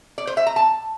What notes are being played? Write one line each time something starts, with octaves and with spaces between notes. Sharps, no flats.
D5
C5
E5
A#5
A5